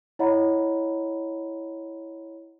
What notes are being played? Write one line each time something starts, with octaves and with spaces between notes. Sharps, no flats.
E4 C#5 D#5 F#5 A#5 B5